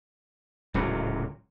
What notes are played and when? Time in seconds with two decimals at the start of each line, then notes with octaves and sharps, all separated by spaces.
0.74 D1 C#2 A#2 F#3